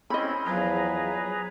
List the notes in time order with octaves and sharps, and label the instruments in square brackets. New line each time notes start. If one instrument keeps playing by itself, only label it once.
[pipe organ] C4 C#4 E4 [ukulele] D#5 B5
[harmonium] E2 F3 [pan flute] F#3 [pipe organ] G#4 B4 A#5